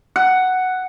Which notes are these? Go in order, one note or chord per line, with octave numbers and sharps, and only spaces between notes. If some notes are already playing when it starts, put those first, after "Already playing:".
F#5